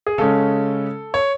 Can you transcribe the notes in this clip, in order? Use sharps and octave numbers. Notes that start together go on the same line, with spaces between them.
G#4
C#3 G#3 C#4 A4
C#5